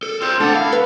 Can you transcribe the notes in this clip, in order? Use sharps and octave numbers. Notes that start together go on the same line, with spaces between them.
A4
C4 F4 A4 C5
A2 D4 A4 F#5
E4 F5
B4